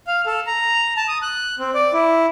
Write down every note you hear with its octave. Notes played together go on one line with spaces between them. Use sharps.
F5
A4
A#5
A5
D#6
F#6
C4
D5
E4